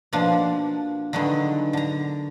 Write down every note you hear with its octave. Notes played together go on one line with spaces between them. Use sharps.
B2 F3 A#3 D4 F4
D3 D#3 F#3 G#3 B3
D3 A#5